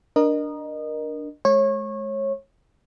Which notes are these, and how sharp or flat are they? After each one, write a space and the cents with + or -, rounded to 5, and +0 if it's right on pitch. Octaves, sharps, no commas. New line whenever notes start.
D4 +0 A#4 +15 D#5 -20
G#3 +35 C#5 -25